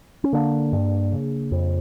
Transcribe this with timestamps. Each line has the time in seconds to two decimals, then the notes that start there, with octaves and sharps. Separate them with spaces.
0.24 C#4
0.33 D3 A#3 D4
0.73 G2
1.12 C#3
1.52 F2